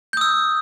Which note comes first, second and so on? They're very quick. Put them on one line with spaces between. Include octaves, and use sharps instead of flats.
G6 D#6 E6